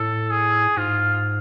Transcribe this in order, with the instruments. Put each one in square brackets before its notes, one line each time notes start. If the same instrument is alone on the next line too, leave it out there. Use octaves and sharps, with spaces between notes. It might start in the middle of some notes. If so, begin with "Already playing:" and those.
Already playing: [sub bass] A2 [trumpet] A4
[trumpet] G#4
[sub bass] G#2 [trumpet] F4